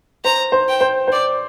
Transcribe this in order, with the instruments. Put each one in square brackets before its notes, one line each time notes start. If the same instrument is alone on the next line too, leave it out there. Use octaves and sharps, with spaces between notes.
[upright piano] C5 [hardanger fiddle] A#5
[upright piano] C5
[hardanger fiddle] G5
[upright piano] C5
[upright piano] C5 [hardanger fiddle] D5